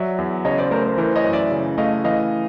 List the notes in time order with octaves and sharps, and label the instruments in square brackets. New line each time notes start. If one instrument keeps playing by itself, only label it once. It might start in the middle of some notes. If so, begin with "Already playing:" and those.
Already playing: [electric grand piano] F#3 [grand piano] D5 E5
[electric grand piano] E2
[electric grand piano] C#3 [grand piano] C#5 D#5
[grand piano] C5 D5
[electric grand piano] A3 [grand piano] A#4 C5
[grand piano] A#4 C5
[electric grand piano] E3 [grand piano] A#4 C5
[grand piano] C#5 D#5
[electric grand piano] F#2
[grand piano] D5 E5
[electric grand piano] C#3
[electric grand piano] A3 [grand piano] D#5 F5
[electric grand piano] E3 [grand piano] D#5 F5